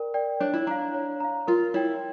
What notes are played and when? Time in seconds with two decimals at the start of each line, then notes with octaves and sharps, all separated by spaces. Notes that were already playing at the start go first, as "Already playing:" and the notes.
Already playing: A#4 D5 G5
0.14 D5 G5
0.40 D4 C#5
0.54 E4
0.67 D4 F5 A#5
0.94 C#5
1.20 F5 A#5
1.47 F4 A#4
1.74 E4 C#5 G5